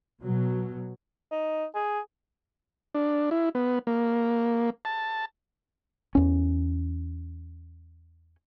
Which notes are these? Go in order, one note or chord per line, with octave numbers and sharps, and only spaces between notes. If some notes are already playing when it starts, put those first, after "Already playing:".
B2 F#3
D#4
G#4
D4
E4
B3
A#3
A5
E2 C#4